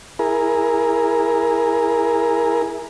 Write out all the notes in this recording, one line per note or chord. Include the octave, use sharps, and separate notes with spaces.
E4 G#4 A#4